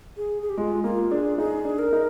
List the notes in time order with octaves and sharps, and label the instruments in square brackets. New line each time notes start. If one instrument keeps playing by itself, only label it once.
[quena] G#4
G#4
G4
[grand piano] G#3 [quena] F4
[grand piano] A#3 [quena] F4
[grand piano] D4 [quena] G#4
[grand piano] D#4 [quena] G#4
[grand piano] D4
[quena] A#4
[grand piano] D#4